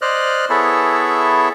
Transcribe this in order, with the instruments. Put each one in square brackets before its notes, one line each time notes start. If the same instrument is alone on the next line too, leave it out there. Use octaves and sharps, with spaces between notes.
[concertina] C5 D5 D#5 F6 F#6
B3 E4 G#4 A4 C#5 E5